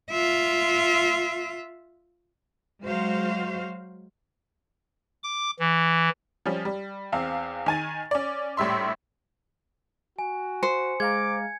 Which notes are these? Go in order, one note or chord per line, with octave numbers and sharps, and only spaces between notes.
F4 E5
F#3 G#3 F#4 C5 F5
D6
E3
F3 G3 C#4
G3
E2 C4 F5
D#3 G#5 A6
C#4 D5
A#1 A2 G3 E5 C6
F#4 G#5
C5 C#7
G#3 F5 A#5 D6 G#6